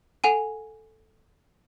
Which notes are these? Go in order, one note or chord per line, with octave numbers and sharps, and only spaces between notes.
A4 F#5 G#5 D#7